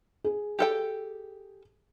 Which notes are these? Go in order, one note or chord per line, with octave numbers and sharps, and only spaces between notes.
G#4
G4 A4 G5